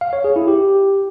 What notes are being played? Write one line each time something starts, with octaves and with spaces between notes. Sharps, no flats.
F5
C#5
G#4
E4
G4